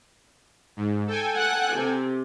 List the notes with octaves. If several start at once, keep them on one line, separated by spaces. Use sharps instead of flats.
G#2
A4 G5 G#5
F#5 F#6
C3